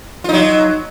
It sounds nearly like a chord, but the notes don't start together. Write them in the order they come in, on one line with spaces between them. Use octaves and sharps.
F4 D#4 F#3